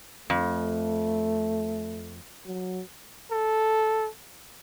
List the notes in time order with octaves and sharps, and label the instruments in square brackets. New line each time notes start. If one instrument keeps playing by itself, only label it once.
[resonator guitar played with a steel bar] F2 [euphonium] A3
[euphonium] F#3
[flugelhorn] A4